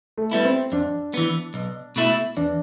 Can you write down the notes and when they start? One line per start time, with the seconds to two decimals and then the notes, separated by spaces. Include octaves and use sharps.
0.18 A3
0.31 G3 B3 E4
0.45 C4
0.72 F2 D4
1.14 E3 B3
1.54 B1
1.96 B2 A3 E4
2.37 E2 D4